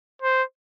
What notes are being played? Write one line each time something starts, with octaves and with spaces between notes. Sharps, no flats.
C5